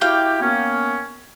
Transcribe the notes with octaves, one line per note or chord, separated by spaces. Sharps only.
E4 F#4 G4 F5 G5 D6
A#3 B3 C#4